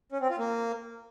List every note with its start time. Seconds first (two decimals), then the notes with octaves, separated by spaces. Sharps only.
0.12 C#4
0.21 C4
0.30 F4
0.39 A#3